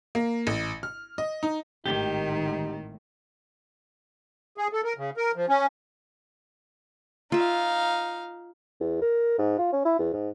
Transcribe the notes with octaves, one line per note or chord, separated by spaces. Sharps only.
A#3
A1
F6
D#5
D#4
G#1 A2 D#3 D#4 G4
G#4
A4
A#4
C#3
A#4
F3
C#4
D#4 F4 E5 F5
E2
A#4
G#2
F4
C#4
E4
E2
G#2